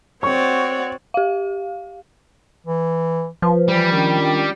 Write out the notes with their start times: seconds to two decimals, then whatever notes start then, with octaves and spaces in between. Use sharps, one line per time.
0.23 C4 F#4 C#5 D5 C#6
1.14 G4 F5
2.67 E3
3.42 F3 F4 B4
3.68 E3 G3 G5
3.92 D#3 C#4 D4 F4